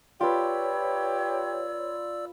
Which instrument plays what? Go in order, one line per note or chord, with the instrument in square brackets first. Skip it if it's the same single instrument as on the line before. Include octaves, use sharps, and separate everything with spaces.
[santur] F4 B4 [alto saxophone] G4 [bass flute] C#5 [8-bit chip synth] D5 E6